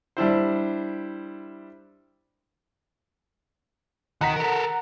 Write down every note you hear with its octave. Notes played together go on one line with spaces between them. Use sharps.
G3 D4 E4 C5
D#3 F#5 A#5 B6
A4 A#4